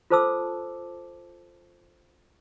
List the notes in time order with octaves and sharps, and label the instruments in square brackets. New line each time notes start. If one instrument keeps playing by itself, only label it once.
[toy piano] F4 A4 C5 A5 D6 E6